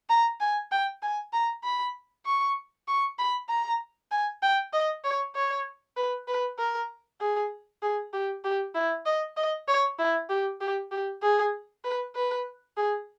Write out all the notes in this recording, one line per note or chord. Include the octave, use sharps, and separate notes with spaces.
A#5
G#5
G5
G#5
A#5
B5
C#6
C#6
B5
A#5
G#5
G5
D#5
C#5
C#5
B4
B4
A#4
G#4
G#4
G4
G4
E4
D#5
D#5
C#5
E4
G4
G4
G4
G#4
B4
B4
G#4